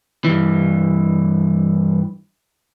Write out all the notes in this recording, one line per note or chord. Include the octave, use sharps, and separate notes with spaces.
G2 E3